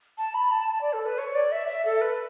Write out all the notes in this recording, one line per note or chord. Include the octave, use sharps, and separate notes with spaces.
A5
B5
A5
A5
D5
A4
B4
C#5
D5
E5
E5
A4
B4